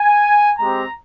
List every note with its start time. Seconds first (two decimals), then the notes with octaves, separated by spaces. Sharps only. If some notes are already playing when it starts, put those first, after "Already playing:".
Already playing: G#5
0.58 G#3 C4 G4 A#5